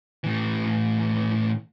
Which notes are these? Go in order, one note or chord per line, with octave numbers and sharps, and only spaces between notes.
A2 E3